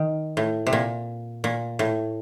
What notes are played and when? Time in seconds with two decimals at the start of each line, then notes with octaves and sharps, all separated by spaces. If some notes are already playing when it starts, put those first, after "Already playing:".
Already playing: D#3
0.37 A2
0.67 C3
0.73 A#2
1.44 A#2
1.79 A2